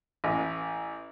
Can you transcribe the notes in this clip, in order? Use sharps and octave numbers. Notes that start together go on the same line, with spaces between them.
A1